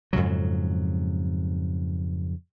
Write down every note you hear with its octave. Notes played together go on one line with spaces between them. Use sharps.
F2 G#2 C#3 F#3